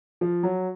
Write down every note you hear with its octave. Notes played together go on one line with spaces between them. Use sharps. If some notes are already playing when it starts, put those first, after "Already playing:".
F3
F#3